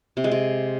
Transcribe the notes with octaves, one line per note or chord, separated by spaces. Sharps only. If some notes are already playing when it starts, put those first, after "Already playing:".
C3
G#3
C3